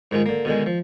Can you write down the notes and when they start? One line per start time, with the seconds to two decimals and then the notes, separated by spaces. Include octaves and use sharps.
0.11 G#2 D#3 G#3 F4
0.26 D3 A#3
0.45 B2 D3 D#3 G#3
0.66 F3